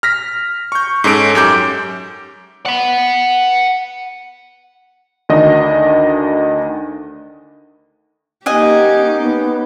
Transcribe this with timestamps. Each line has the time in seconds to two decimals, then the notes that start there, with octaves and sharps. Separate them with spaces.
0.03 F6 A#6 B6
0.72 C#6 G6
1.04 G#2 C#4 A4 D7
1.35 F#2 G4 D6 G6 D7
2.66 F#5 B5
5.29 D2 D#3 D4 D#5
8.46 A#3 C#4 D#4 G4 D#5 F#5 G#5
9.19 B3